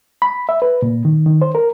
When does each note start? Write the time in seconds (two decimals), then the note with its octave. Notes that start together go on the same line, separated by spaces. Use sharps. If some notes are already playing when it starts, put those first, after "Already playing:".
0.22 B5
0.49 E5
0.62 B4
0.82 A#2
1.05 D#3
1.26 D#3
1.42 C5
1.55 A#4